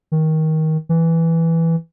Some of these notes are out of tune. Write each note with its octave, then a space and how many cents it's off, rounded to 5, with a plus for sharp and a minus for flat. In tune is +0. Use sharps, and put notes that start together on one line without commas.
D#3 +20
E3 +0